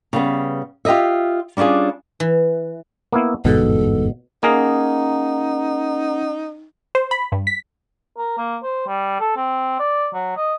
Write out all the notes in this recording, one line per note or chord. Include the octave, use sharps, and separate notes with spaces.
C#3 G3 B3
F4 G4 B4 D#5 E5
G3 C#4 D4 F4 G#4
E3
A#3 B3 E4
G1 E2 G#2 B2 A4
A#3 C#4 D#4 G#4 A#4 F#5 A#5
C5
B5
G2
B6
A#4
A#3
C5
G3
A4
C4
D5
F#3
D#5